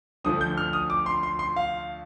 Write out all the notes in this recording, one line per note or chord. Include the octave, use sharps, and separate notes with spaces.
D2 D3 F3 D#6
G6
F6
D#6
D6
C6
C6
C6
F5